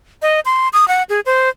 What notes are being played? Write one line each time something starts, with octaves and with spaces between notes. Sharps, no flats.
D#5
C6
D#6
F#5
G#4
C5